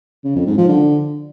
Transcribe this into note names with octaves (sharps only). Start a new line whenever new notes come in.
C#3
F2
G#2
F3
D3